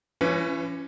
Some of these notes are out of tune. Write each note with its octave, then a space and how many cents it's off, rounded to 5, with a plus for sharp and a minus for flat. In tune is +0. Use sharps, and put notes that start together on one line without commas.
E3 +40 C#4 +0 B4 +20